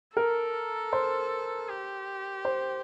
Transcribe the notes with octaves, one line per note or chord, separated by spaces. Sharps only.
A4 A#4
C5
G4
C5